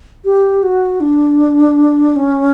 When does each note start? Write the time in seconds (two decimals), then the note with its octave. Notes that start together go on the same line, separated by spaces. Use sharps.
0.25 G4
0.63 F#4
1.00 D4
2.16 C#4